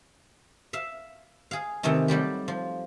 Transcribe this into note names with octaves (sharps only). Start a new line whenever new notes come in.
E5 F5
G#4 F5
C3 D#3 E3 A3 D#4
F#3 G3 A3 G4
F3